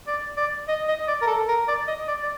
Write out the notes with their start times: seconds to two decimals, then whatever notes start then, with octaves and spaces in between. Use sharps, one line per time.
0.07 D5
0.37 D5
0.68 D#5
0.88 D#5
1.07 D5
1.22 A#4
1.27 A4
1.48 A#4
1.68 D5
1.88 D#5
2.08 D5
2.23 D5